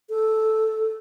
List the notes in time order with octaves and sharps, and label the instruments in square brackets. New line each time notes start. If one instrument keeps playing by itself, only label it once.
[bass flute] A4